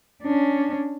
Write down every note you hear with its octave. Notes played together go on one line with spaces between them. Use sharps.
C#4 D4